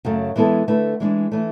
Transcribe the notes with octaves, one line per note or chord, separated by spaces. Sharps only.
F#2 C#3 F#3 A3
E3 G#3 B3 E4 A4
D3 A3 E4 B4
E3 G#3 D4
E3 A3